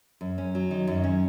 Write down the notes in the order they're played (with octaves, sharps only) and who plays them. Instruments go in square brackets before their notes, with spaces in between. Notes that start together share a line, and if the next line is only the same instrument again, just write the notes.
[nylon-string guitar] F#2
C#4
F#3
D#3
F#2
C#4